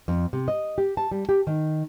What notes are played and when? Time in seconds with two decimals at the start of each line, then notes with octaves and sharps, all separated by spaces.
0.08 F2
0.33 C3
0.48 D#5
0.78 G4
0.97 A5
1.12 G3
1.29 G4
1.47 D#3